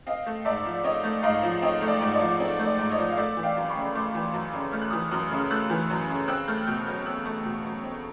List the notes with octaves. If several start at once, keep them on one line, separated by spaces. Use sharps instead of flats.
C4 D#5 F5
A3
G#2 D5 E5
F3
C4 C#5 D#5
A3
G#2 D#5 F5
F3
C4 C#5 D#5
A3
D5
G#2
D5
F3
C4 D5
A3
D5
G#2
C#5 D#5
F3
F5
A3 D5 E5
E3
F5 G5
F#2
B5 C#6
C#3
A3 C6 D6
E3
F#2
C#3
A3 F6
F#6
E3 D#6 F6
F#2 D#6 F6
C#3
F6
A3 E6 F#6
E3
F#2
C#3
C4 E6 F#6
A3 F6 G6
F#6
B2 F6 G6
F#3 F6 G6
C4 E6 F#6
A3
B2
F#3
C4